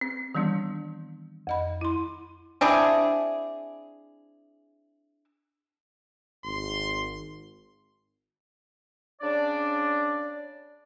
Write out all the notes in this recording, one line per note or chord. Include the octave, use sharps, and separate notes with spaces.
C4
D#3 E3 G3 B3 D4
F2 D#5 B5
E4 C6
C4 D4 E4 G#4
G#1 C6
C#3 D4 D5